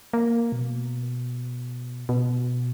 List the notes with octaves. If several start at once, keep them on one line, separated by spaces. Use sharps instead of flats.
A#3
B2
B2